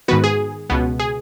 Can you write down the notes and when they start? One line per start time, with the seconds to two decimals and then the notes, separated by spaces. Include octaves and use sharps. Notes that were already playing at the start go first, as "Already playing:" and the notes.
0.08 G#2 D#3 B3 F#4 B4
0.24 G#4
0.70 C#2 B2 B3
1.00 G#4